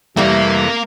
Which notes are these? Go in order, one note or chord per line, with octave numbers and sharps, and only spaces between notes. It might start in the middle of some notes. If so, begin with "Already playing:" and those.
F2 C3 E3 G3 A3 A#3 F5